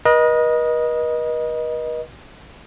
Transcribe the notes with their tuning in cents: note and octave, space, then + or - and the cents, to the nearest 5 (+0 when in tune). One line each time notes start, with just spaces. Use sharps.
B4 -45 D#5 +0